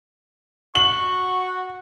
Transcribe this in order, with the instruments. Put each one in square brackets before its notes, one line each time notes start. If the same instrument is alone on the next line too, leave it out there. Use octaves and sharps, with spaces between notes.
[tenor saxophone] F#4 [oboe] C#6 [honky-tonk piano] F#7